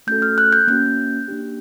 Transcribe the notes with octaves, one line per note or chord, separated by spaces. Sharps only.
A3 C#4 F#4 A4 G6
F6
F#6
G6
A#3 C#4 F#4 G6
A#3 D4 G4